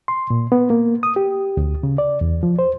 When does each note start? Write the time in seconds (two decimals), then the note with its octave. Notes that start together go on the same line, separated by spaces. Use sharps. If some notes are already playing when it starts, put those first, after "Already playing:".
0.08 C6
0.30 A#2
0.52 B3
0.70 A#3
1.03 D#6
1.16 G4
1.57 D2
1.83 C#3
1.98 D5
2.21 E2
2.43 F3
2.59 C5